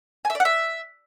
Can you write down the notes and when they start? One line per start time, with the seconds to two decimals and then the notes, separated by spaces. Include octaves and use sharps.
0.25 G#5
0.30 E5
0.35 D5
0.40 F#5
0.45 E5